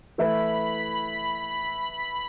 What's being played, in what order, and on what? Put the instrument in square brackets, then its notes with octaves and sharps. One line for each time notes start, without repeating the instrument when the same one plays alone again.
[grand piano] E3 A3 E4 B4 [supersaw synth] B5